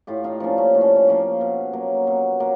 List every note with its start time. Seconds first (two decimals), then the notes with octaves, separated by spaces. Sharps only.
0.07 A2 F4 G4
0.24 D#4 F4
0.40 F3 A#3 C#4 D4
0.58 C#4 D#4
0.74 A2 D4
0.81 C#4
0.96 C#4
1.07 F3 A#3 C#4
1.41 B2
1.73 F#3 A#3
2.07 B2
2.40 F#3 A#3